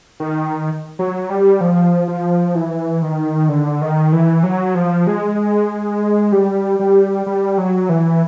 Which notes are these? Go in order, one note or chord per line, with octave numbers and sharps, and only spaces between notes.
D#3
F#3
G3
F3
F3
E3
D#3
D3
D#3
E3
F#3
F3
G#3
G3
G3
G3
F#3
E3